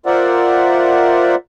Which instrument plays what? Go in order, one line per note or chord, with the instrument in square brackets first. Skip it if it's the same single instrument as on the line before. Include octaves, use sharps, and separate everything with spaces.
[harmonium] F4 A#4 C5 D5 E5 F#5